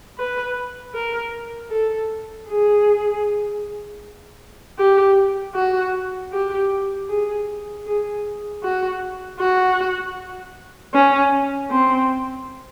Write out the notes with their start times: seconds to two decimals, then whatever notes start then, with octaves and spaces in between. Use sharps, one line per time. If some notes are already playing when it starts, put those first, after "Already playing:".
0.18 B4
0.94 A#4
1.71 A4
2.48 G#4
4.78 G4
5.55 F#4
6.32 G4
7.09 G#4
7.86 G#4
8.63 F#4
9.40 F#4
10.94 C#4
11.70 C4